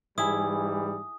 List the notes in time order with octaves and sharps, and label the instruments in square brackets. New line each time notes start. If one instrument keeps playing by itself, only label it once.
[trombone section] G#2 E3 G3 [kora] E4 G#4 [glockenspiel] D#6